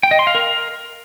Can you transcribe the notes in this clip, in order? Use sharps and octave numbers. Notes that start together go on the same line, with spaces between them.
G5
D#5
C6
F5
A#4